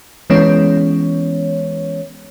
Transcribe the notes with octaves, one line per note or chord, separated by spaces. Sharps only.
E3 G#3 B3 C#4 C#5